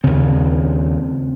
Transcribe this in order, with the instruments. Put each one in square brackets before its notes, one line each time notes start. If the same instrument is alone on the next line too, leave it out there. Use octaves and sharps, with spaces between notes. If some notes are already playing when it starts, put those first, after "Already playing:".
[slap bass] D#2 C#3 C4